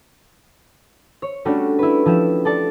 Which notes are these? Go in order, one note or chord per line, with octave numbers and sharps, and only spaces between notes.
C#5
G3 A3 C#4 D4 F#4
E4 B4
F3 E4 G4 E7
A4 D5 A5